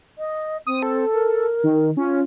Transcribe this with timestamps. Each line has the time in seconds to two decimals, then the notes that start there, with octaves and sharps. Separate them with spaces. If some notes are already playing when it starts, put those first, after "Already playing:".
0.18 D#5
0.67 C4 D#6
0.83 A4
1.13 A#4
1.63 D#3
1.97 C#4 F4